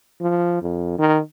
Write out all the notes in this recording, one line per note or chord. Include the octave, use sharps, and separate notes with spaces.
F3
F2
D#3